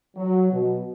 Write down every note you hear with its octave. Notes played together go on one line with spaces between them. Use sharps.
F#3
B2